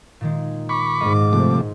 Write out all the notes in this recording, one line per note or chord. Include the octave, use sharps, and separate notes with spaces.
A#2 D#3 G#3
B5 C#6 D6
G#2 F4 D#5
C3 F3 A3